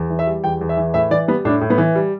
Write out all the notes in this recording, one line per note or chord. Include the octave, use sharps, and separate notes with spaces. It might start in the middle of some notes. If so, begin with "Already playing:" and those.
Already playing: E2
E3
E5
G3
E2 G5
E2
E5
E3
A2 E5
E3 D5
G3 B3
A2 D4
A2
B3
E3
G3